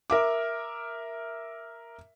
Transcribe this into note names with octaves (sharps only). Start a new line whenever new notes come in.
A#4 E5 D6